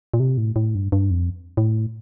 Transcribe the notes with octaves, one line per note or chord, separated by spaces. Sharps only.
A#2
C3
A2
A2
G2
G2
F2
A2